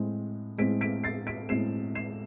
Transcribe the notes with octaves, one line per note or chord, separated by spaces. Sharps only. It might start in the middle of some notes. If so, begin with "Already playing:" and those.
Already playing: A2 G#3 C4
A2 G#3 C4 B6 D7
B6 D7
A6 C7
B6 D7
A2 G#3 C4 C7 E7
C7 E7